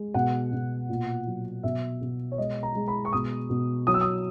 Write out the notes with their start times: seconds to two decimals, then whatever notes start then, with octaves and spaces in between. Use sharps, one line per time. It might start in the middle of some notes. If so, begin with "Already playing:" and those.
Already playing: G#3
0.14 B2 F#5
0.52 B2
0.89 A#2
1.27 F#3
1.63 B2 E5
2.01 B2
2.32 C#5
2.38 G#3 D#5
2.63 A#5
2.75 G#3
2.88 B5
3.05 C#6
3.13 B2 D#6
3.50 B2
3.87 F#3 D#6
3.94 E6
4.01 D#6